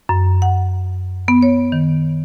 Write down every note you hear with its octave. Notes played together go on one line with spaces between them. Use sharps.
F#2
F#5
B3
C#5
D#3